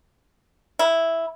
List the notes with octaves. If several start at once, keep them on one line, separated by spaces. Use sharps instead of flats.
E4